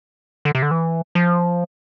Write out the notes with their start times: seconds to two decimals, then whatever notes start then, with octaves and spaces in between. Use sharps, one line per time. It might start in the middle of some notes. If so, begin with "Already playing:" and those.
0.45 D3
0.55 C3
0.62 D3
0.71 E3
1.15 F3